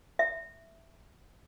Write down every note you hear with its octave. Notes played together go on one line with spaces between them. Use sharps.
E5